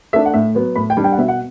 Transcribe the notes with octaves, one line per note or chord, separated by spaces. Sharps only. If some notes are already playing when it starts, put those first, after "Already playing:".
A3 D4 E5
F#5
A2 E5
F#3 B3
A2 B5
G5
G3 D4
G5
F#5
B2 E5
F#5